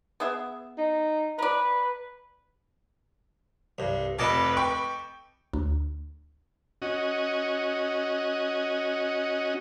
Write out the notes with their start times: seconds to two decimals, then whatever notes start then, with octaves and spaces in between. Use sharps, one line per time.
0.20 B3 G#4 E5
0.78 D#4
1.39 B4 D5 A#5
3.78 C2 G2
4.19 F1 A4 B4 D#5 D6
4.57 G5 C#6
5.53 D2
6.82 C#4 F#4 D#5